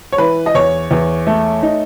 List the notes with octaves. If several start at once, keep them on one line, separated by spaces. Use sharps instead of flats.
C#5
E3 B4
D#5
E2 C#5
E2
A3
D#4